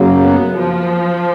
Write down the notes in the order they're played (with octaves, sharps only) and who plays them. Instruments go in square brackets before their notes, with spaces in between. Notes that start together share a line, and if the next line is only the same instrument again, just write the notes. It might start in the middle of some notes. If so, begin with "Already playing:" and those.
Already playing: [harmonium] F#2 C#3 F#3 A#3
[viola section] B3
F3